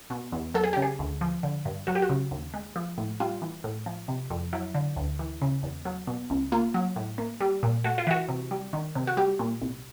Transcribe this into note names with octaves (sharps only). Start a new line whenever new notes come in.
B2
E2
F#3 A4
G#4
C#3 G4
G#4
D2
F3
D3
G2
F#3 F#4
G4
F#4
C#3
D#2
G#3
F3
A2
G3 F4
E3
A2
F3
C3
F2
F#3 E4
D3
D2
E3
C#3
E2
F#3
B2
C#2
A#3 F4
F#3
A2
A#3
G3
A#2
A3 F#4
F4
E3 F#4
C3
G3
D#3
C3
F#4
G3 G4
A#2
C2